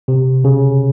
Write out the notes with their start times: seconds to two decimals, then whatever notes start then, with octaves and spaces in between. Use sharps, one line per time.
0.08 C3
0.44 C#3